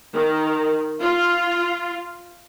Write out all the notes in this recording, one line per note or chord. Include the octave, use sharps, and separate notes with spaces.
D#3
F4